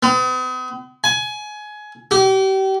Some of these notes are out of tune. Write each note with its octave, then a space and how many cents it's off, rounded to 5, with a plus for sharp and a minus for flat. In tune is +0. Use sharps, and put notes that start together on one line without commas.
B3 +45
G#5 +20
G4 -35